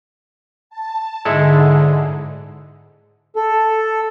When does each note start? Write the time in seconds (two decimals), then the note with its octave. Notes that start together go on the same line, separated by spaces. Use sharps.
0.70 A5
1.25 G#2 D3 G#3 E4 A4
3.36 A4